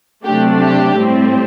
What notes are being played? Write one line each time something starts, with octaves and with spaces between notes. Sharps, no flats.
C3 F#3 A3 D4 G4
G4
A2 G3 C4